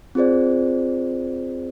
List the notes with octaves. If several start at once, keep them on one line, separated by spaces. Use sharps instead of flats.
C4 F4 G#4 C5 D5